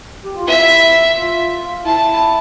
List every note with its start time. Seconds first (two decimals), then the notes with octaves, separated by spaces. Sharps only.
0.24 G4
0.35 F4
0.46 E4 E5
1.16 F4
1.85 E4 A5